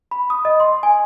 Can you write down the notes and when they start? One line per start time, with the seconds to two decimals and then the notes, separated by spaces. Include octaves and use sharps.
0.11 B5
0.30 D#6
0.45 D#5
0.60 C6
0.83 G#5